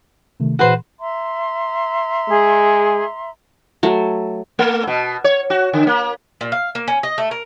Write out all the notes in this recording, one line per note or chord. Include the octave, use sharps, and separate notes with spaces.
C3 D#3 A3
A#2 E3 F#4 G#4 B4 C5
E5 A#5 C6
G#3 G#4
F#3 A3
A3
B2
C#5
F#4
D3
A#3
A#2
F5
A#3
C#4
D#5
A3
A#4